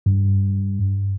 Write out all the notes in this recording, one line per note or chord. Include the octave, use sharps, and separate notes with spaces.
G2